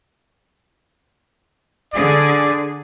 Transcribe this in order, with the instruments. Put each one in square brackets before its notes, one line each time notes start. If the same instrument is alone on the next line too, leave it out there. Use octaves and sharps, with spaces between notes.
[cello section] D3 G#4 [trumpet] D5